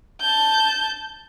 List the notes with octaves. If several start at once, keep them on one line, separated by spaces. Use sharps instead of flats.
A5 G6